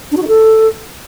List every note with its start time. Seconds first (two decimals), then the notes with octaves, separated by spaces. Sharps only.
0.12 D4
0.17 F#4
0.22 D#4
0.28 A4